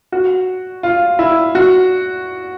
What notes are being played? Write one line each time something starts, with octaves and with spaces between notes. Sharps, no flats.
F#4
F4
E4
F#4